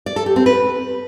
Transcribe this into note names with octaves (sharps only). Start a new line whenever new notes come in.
D5
A4
G4
C4
B4